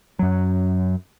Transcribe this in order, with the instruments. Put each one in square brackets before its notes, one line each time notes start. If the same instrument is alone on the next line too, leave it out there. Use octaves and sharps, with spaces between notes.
[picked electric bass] F#2 F#3